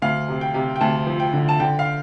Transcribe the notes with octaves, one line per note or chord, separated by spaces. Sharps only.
D2 F5
C3
G5
C3
G5
D2 A5
F3
G5
D3
A5
D3 G5
F5